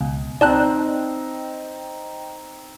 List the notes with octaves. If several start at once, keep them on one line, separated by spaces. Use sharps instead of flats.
C#2 B2
C4 D#4 D5 D#5 G5 A5 F#6